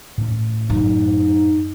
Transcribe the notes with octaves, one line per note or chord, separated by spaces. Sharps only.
A2 C#4
F#2 D#4